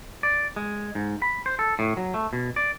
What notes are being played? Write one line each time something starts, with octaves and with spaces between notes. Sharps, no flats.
D5
G#3
G#2
B5
C5
A4
A2
F#3
A3
B2
D5